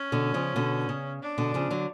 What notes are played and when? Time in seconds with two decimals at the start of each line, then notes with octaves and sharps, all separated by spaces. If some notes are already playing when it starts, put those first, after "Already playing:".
Already playing: C#4
0.12 B2 D3
0.34 C#3 F3
0.56 B2 D3
0.89 C#3
1.22 D4
1.38 B2 D3
1.54 C#3 F3
1.70 D3 F#3